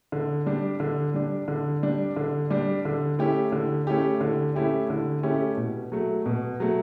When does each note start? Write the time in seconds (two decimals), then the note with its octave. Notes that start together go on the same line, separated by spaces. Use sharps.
0.12 D3
0.46 G3 D4
0.80 D3
1.14 G3 D4
1.48 D3
1.83 G3 D4
2.16 D3
2.50 G3 D4
2.85 D3
3.19 A3 C#4 E4 G4
3.52 D3
3.87 A3 C#4 E4 G4
4.21 D3
4.56 A3 C#4 E4 G4
4.90 D3
5.23 A3 C#4 E4 G4
5.57 B2
5.92 F#3 A3
6.26 B2
6.60 F#3 A3